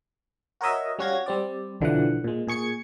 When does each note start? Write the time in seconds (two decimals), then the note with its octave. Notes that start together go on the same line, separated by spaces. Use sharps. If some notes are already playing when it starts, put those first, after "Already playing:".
0.61 F#4 A#4 C#5 D#5 E5
0.99 G3 C#4 F#4 F5 G#6 A#6
1.26 G3 C4 D5
1.80 B1 D3 E3 F3 F#5
2.24 A#2 G#3
2.47 A#2 G#4 C#6 G#6 C#7